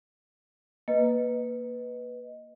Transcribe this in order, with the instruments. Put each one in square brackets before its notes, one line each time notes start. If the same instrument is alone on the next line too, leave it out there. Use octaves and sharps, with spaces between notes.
[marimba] A#3 [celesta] B4 D#5